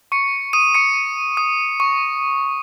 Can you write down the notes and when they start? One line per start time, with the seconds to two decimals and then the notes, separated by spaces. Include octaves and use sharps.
0.12 C#6 C#7
0.53 D#6 D#7
0.75 C#6 C#7
1.37 D#6
1.80 C#6